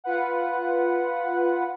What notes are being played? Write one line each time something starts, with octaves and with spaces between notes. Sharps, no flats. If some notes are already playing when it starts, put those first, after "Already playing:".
F4 B4 F#5